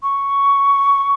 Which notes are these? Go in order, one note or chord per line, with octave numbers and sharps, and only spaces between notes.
C#6